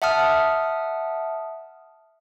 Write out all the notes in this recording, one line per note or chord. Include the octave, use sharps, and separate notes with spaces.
E5 F#5 A5 D#6 F6